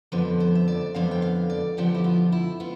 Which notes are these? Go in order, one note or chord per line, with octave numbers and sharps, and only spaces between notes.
F2 D3 F3 B3 B4
C5
E5
D5
F2 D3 F3 B3 F5
G5
F5
D5
F2 D3 F3 B3 G4
E4
F4
E4
B3 F4